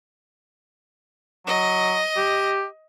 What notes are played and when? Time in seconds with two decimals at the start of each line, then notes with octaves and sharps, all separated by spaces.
1.47 F#3 D#5
2.17 G4